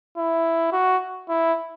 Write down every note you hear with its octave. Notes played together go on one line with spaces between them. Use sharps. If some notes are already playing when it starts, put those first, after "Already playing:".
E4
F#4
E4